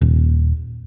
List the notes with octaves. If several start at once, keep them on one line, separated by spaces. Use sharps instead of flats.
D#1